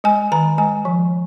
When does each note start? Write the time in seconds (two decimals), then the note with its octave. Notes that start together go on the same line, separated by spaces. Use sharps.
0.04 G#3 G#5
0.32 D#3 A#5
0.58 G#3 G#5
0.85 F3